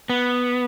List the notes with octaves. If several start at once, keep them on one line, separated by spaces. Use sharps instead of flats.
B3